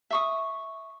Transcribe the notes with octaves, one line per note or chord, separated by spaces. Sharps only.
E5 C#6 D#6